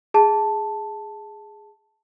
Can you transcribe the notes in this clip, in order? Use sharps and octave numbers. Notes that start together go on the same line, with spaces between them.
G#4 A5